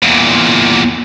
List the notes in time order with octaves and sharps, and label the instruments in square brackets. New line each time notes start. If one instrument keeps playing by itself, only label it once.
[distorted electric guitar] E2 A#2